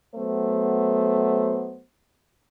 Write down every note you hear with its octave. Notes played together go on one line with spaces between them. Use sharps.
F#3 A3 B3 C5